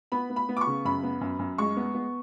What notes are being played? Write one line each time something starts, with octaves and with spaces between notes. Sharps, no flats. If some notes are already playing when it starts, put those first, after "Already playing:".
B3 B5
B3
B5
B3
D6
C#6
C#3
F#2 B5
B3
F#2
F#2
G#3 C#6
B3
B3